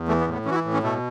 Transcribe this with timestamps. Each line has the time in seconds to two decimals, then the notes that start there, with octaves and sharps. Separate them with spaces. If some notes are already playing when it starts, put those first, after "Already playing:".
Already playing: E2
0.08 E3 A3
0.21 B3
0.26 A2
0.33 B3
0.45 E3 C#4
0.51 F#4
0.55 E4
0.65 A2
0.74 C#4
0.83 B2 A3